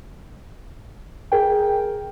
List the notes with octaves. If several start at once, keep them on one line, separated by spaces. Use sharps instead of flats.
G#4 A#4 G5